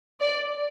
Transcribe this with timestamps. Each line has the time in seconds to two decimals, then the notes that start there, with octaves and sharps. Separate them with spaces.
0.21 D5